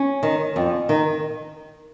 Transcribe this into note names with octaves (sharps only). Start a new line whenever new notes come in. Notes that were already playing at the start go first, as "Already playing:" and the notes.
Already playing: C#4
D#3
F2
D#3